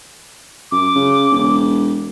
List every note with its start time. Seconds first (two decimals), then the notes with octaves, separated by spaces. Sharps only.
0.71 F#2 D6
0.95 C#3
1.32 E1